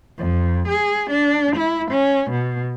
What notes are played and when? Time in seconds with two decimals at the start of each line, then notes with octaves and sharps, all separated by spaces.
0.18 F2
0.68 G#4
1.11 D4
1.56 E4
1.91 C#4
2.30 B2